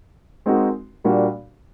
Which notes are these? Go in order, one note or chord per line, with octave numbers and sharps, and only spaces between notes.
G#3 C4 D#4 F#4 A#4
A#2 G3 A#3 D4 F#4